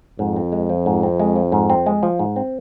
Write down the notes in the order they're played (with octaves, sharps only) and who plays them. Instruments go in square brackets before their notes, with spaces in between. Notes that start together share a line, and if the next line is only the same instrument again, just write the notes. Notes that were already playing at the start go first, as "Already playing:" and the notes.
[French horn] F2 [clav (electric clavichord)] G#2
[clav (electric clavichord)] C4
G#3
F3
G#2
C4
G#3
F3
G#2
C4
G#3
F3
G#2
C4